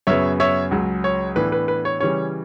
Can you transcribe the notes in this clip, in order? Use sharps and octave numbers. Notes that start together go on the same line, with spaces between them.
F#2 C#3 F#3 B3 C#5 E5
C#5 E5
C#2 C#3 F#3
C#5
A2 E3 B3 D4 B4
B4
B4
C#5
C#3 E3 G3 C#4 C#5